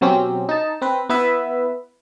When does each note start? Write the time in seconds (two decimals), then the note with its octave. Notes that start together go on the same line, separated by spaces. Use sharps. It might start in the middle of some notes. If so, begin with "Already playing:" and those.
0.01 B2 F#3 C4 C#4 G4
0.49 D#4 A5
0.82 C4 B4
1.09 B3 E4 B4 E5